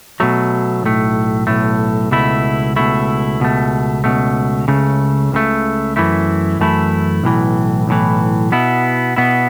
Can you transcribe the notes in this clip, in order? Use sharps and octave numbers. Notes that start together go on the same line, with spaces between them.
B2 F#3 A3
B1 A2 A3
B1 A2 A3
C#2 B2 A3 E4
C#2 B2 A3 E4
C#2 B2 A3
C#2 B2 A3
C#2 C#3 A3
C#2 C#3 A3
F#2 E3 A3 E4
F#2 E3 A3 E4
B1 A2 E3
B1 A2 E3
B2 B3 E4
B2 B3 E4